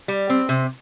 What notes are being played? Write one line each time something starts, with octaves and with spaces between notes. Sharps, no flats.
G3
C4
C3